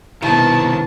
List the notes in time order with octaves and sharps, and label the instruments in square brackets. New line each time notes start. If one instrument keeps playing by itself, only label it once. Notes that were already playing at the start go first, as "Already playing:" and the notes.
[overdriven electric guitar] C2 D#3 [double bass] B2 B3 [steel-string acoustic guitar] E4 [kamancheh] A5